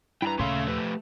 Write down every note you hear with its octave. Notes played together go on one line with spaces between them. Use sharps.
G2 E4 B4 G5 A#5
D#2 A#2 C#3 A3 C#4 E5 F5 C6
F3 G4 A4 B4